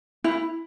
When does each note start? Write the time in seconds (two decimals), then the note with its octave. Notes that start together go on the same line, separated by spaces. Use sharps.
0.24 E4